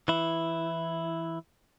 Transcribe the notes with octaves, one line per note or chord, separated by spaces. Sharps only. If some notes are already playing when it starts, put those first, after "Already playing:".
E3 E4